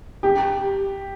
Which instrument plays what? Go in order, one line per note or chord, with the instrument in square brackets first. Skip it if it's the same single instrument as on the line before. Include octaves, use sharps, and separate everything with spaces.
[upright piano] G4